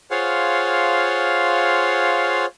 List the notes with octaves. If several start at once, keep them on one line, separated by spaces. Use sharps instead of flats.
F4 G#4 C5 C#5 F5 F#5